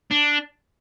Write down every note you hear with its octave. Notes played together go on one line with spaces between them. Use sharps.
D4